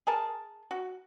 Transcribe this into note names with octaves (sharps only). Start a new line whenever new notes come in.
G#4 A#4 A5
F#4